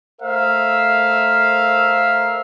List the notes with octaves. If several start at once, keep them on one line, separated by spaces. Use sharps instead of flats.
A3 A#4 C5 E5 F5